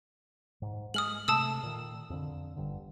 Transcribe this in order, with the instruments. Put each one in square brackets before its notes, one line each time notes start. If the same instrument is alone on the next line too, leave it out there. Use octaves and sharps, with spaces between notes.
[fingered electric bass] G#2
[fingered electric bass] G#3 [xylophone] D#6 F6 F#7
[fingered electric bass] C3 A3 [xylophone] A5 D#6 E6
[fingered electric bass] A#2 D#3
F2 D3
G1 G2 D3